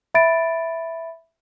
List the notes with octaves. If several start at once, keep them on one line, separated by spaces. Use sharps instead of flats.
E5 B5 A6 D7